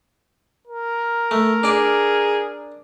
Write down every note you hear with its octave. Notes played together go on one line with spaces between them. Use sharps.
A#4
A3
D4 G#4 D5